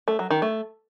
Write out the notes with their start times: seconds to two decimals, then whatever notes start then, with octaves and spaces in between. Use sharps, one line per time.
0.08 A3
0.19 F#3
0.30 D#3
0.42 A3